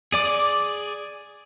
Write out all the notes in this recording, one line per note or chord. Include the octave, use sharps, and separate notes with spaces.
G#4 D5 D6